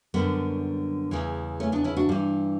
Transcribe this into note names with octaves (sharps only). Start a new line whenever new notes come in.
F#2 D3 G3 B3
E2 C#3 E3
A3 C#4
B3 D4
C#4 E4
D4 F#4
G2 E3 G3